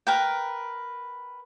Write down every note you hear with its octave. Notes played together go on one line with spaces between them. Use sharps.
A#4 B4 G5